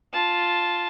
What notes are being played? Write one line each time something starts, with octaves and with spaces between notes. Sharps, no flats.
F4 A5